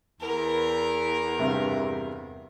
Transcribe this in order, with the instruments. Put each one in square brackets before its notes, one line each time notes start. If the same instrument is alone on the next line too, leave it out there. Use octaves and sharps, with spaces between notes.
[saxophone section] E2 [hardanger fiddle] A#4
[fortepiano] G2 C3